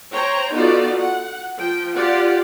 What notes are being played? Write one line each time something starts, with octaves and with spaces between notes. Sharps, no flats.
C5 C#5 G5 A#5
B3 D#4 F4 F#4 A4 D5
F#5
F3 G5
F4 G4 D5 F#5